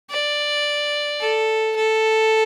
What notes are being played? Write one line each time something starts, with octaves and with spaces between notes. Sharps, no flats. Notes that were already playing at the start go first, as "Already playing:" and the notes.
D5
A4
A4